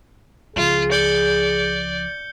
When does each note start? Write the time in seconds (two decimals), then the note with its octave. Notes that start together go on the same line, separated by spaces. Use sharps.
0.56 C#2 F3 F4 G#4
0.92 D5 G6 C#7 G7